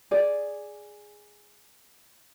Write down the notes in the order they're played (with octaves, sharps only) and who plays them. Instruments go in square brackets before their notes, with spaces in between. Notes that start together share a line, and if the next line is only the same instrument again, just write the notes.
[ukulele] G#4 D5